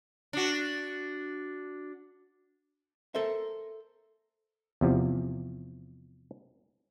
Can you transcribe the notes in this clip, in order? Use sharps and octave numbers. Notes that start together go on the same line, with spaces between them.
D4 F#4
A4 A#4 C5 E5
E2 C3 F3